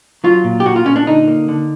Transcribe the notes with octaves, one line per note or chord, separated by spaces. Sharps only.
F#3 F4
A#2
G4
A#2 F#4
F4
A#2 C#4
D4
D3 D#4
A#3
D3